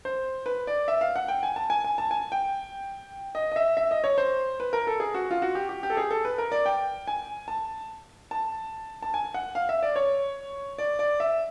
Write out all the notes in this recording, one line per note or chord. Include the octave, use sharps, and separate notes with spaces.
C5
B4
D5
E5
F5
F#5
G5
G#5
A5
G#5
G#5
A5
G#5
G5
D#5
D#5
E5
E5
D#5
C#5
C5
B4
A#4
A4
G#4
F#4
F4
F#4
G4
G4
G4
A4
G#4
A4
B4
A#4
D5
G5
G#5
A5
A5
A5
G#5
F#5
F5
E5
D5
C#5
D5
D5
E5